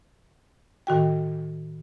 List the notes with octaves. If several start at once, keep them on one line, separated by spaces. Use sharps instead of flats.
A2 D#3 F#4 G5